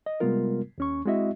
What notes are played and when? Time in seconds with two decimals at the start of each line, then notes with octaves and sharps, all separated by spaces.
0.06 D#5
0.20 C3 G3 G#3 B3 F4 A#4
0.78 D#2 C#4 C#6
1.06 G#3 C4 E4 F#4 D#5 E5